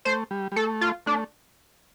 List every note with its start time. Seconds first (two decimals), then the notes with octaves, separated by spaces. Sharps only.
0.05 A3 C5
0.31 G3
0.52 G3
0.56 A3 A4
0.81 F4
1.06 A3 D4